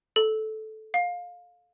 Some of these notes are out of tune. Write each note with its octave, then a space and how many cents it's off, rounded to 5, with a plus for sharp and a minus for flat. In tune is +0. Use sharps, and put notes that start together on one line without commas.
A4 -15
F5 +20